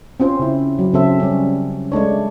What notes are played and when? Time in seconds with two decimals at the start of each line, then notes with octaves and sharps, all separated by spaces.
0.20 C4 C#4 F4 C5
0.39 C#3 E4
0.79 F#3
0.94 C#3 C4 A4 E5
1.20 G3 C#4
1.92 G#3 A3 D4 C#5